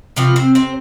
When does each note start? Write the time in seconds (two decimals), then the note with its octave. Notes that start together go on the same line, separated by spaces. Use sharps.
0.16 C3 E3 F3 F4
0.36 C4 C5
0.55 C4 C5